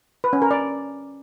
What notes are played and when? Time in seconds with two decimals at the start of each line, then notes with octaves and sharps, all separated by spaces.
0.24 B4
0.33 C#4
0.42 A#4
0.51 D5